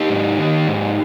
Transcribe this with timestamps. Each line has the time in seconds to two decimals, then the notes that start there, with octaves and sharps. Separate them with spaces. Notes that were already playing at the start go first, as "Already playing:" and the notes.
Already playing: D#4 G4
0.09 G#2
0.38 D#3
0.67 G#2